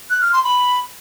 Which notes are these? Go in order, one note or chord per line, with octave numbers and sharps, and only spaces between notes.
F#6
F6
C6
B5